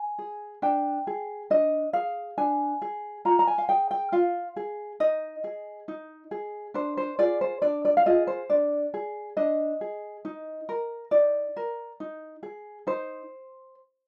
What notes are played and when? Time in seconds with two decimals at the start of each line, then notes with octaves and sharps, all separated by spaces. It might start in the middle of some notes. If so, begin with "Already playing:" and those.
Already playing: G#5
0.18 G#4
0.62 D4 G5
1.07 G#4
1.50 D4 D#5
1.93 G#4 F5
2.38 D4 G#5
2.82 G#4
3.25 F4 A#5
3.39 A#5
3.47 G#5
3.58 F5
3.69 G#4 G5
3.91 G5
4.12 F4 F5
4.56 G#4
5.00 D#4 D#5
5.44 G#4
5.88 D#4
6.31 G#4
6.74 D4 C5
6.97 C5
7.19 F4 G#4 D5
7.41 C5
7.62 D4 D5
7.85 D5
7.97 F5
8.06 F4 G#4 D#5
8.27 C5
8.50 D4 D5
8.94 G#4
9.37 D4 D#5
9.81 G#4
10.25 D#4
10.69 A#4
11.11 D#4 D5
11.56 A#4
12.00 D#4
12.43 G#4
12.87 D#4 C5